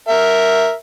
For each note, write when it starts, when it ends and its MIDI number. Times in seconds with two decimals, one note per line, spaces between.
0.08 0.73 70
0.08 0.73 76